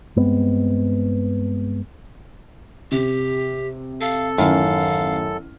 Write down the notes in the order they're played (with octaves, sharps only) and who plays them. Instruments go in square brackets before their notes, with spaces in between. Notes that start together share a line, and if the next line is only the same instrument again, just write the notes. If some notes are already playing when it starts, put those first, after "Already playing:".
[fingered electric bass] G2 G#3 B3 C4
[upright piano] C3 [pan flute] G4
[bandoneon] A4 [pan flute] F5
[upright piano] A1 D#3 F6 [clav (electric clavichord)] F#2 [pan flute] F5